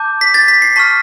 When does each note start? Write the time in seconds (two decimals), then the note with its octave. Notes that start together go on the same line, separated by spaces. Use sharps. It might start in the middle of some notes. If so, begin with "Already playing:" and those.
Already playing: A5 D6 G6
0.21 B6
0.34 A6
0.48 B6
0.62 C7
0.76 A5 C#6 F6 B6